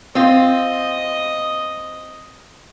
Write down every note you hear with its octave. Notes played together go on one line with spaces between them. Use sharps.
C4 F4 D#5